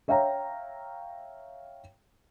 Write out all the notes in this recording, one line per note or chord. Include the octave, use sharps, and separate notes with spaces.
C#5 E5 F5 G5 A#5